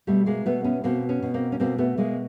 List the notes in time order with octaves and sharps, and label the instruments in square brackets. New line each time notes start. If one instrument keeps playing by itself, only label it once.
[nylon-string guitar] B2 G3 A3
G#3 A#3
B2 A3 B3
B3 C#4
B2 A#3 C4
B3 C#4
B2
A#3 C4
C#4
B2 A#3 C4
A3 B3
B2 G#3 A#3